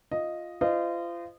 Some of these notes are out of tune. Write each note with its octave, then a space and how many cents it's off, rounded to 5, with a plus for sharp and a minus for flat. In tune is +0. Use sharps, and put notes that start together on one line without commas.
F4 +0 D#5 +0
F4 -30 C5 -30 D#5 -25